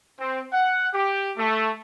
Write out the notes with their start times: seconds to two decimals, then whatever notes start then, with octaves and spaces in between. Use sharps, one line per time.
0.19 C4
0.53 F#5
0.93 G4
1.38 A3